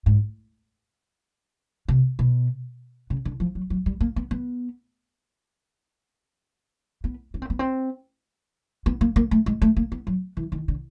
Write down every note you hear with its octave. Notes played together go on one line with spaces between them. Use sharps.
G#2
C3
B2
C#3
D3
F3
F#3
F#3
G3
A#3
B3
B3
B3
C#4
C4
B3
C4
B3
A#3
A#3
A3
G#3
A3
A#3
B3
F#3
E3
D#3
D3